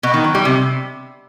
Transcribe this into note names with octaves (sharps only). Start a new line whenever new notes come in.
B2
D#3
F#3
G3
C3